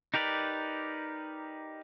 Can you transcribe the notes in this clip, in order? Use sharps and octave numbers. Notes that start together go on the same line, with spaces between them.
D#4 G4 A#4 B4 D5